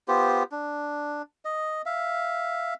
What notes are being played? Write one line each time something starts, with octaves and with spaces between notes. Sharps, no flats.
B3 F4 G4 C5
D4
D#5
E5 F5